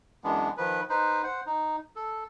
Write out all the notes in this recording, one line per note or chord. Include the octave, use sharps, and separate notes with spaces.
F#2 E3 G#3 B3 D4
D#3 F3 B4
D#4 B4 C5
C5 F#5
D#4
A4